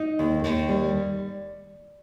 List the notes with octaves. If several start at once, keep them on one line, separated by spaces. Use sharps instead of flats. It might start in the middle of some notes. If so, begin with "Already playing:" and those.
Already playing: D#4
D#2
D#2
G3